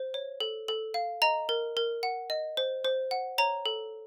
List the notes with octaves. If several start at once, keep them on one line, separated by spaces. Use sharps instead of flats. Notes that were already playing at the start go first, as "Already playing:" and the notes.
Already playing: C5
C#5
A4
A4
F5
D#5 A#5
A#4
A#4
F#5
D#5
C5
C5
F#5
C#5 A#5
A4